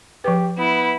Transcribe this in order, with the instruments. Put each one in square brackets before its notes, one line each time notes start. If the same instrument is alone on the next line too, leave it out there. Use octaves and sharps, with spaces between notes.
[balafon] F3 B4 [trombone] G4
[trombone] B3 [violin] E4